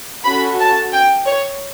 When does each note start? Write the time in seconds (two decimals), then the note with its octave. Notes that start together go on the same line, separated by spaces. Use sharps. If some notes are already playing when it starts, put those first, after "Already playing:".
0.24 C#4 F#4 A4 B5
0.58 A5
0.92 G5
1.26 C#5